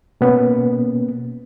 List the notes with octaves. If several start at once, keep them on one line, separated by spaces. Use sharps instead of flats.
B2 A#3 B3 C#4